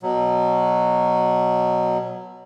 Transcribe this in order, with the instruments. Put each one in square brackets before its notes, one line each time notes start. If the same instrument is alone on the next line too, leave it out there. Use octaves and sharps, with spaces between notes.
[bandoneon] B2 F#3